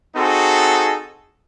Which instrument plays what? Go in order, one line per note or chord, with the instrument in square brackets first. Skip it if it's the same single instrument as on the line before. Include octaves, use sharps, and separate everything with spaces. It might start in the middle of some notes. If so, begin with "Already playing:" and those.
[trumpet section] C4 D#4 F#4 G#4 A4